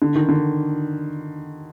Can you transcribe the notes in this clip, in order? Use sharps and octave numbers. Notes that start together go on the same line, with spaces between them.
D3
D#3
D3